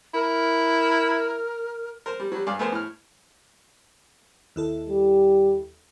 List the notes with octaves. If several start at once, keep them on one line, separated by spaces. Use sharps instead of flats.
E4 A#4
A#4 C5
G3
F#3 G3
G2 G#4 D5 F5
A3 B3 G#4 A#4 C5
A2 F6
D#2 E4 A4
G3